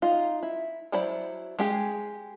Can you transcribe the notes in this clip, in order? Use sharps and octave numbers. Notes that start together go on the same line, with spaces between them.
D#4 F4
E4
F#3 E4 C5 D5 B5
G#3 G4 G#4